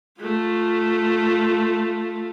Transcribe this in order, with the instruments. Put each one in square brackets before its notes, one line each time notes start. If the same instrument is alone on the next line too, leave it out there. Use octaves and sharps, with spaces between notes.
[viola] A3 F4